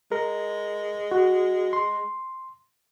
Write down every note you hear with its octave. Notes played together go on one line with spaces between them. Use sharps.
G#3 A#4
F#4
C6